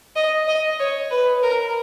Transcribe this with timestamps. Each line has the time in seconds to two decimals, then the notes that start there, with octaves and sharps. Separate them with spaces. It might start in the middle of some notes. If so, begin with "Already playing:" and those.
0.16 D#5
0.47 D#5
0.79 C#5
1.10 B4
1.43 A#4